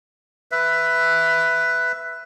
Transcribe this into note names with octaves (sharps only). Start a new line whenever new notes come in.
B4 E5